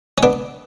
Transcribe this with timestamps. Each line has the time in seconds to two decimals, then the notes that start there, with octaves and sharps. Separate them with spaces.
0.18 C#4
0.23 B3 D4